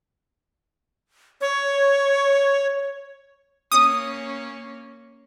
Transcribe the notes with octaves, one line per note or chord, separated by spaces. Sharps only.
C#5
A#3 C#4 D#6